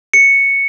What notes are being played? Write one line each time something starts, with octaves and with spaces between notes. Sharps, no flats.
C#7